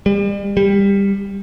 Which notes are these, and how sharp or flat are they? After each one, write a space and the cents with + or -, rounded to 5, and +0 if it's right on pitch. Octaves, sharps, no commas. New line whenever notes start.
G3 +40
G3 +20